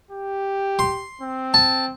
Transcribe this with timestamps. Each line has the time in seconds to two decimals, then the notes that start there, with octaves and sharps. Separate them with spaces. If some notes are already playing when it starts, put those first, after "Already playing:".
0.11 G4
0.79 C6
1.21 C4
1.54 A5